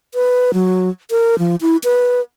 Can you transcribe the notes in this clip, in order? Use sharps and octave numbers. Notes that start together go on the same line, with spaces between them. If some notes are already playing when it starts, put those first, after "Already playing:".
B4
F#3
A#4
F3
E4
B4